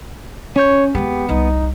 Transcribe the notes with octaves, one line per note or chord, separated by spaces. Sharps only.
C#4 C#5 G6
D#2 G#3 B3 G4
C2 G3 D#4